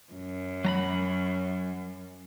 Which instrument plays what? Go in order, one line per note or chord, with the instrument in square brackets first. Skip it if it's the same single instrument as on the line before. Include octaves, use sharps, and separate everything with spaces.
[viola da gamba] F#2
[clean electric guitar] F#3 A#5 B5